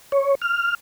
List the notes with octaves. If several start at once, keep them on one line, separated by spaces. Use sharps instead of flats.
C#5
F6